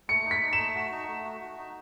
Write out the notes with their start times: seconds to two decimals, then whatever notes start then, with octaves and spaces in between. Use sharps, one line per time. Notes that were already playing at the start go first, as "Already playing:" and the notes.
0.08 A3 C#7
0.25 D#4
0.31 B6
0.41 D#4
0.53 E7
0.58 A3
0.75 F#4
0.92 D#4
1.08 A3
1.25 F#4
1.41 F#4
1.58 D#4